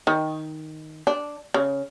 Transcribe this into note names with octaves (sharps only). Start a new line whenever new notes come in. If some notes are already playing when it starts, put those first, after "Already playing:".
D#3
D4
C#3